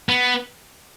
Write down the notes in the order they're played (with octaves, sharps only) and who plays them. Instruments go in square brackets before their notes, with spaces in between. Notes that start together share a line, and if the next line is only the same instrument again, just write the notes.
[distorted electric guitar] B3